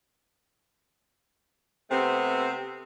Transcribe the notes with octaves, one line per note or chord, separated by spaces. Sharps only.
C3 A3 B3 C4